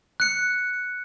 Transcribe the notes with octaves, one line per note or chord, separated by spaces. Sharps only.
F#6 C#7